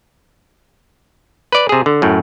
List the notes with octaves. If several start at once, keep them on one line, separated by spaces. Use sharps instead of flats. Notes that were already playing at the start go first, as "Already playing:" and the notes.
B4 D5
C3 G#4
D3
F#2 A2